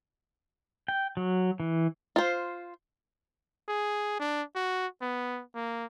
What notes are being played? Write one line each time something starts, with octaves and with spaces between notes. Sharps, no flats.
G5
F#3
E3
F4 C5
G#4
D4
F#4
B3
A#3